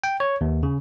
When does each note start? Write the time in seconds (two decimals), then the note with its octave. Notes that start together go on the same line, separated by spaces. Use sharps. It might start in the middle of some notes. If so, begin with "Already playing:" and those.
0.04 G5
0.20 C#5
0.41 D#2
0.63 C#3